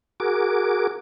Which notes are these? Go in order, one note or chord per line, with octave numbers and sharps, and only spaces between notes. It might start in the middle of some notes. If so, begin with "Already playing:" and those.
F#4 G#4 A#4 D6